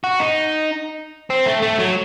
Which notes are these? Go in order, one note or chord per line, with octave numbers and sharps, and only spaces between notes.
F#4
D#4
C4
A3
A3
F#3